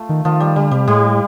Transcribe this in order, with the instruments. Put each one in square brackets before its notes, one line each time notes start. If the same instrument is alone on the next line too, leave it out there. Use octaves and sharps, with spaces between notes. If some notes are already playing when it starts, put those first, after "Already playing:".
Already playing: [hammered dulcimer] A3 F4
[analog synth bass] D#3
[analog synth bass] D#3 [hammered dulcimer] F3
[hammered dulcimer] G3
[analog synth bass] D3 [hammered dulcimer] G3
[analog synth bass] C3 [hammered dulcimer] G3
[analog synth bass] A2 [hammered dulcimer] G3